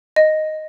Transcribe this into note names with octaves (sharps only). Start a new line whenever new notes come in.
D#5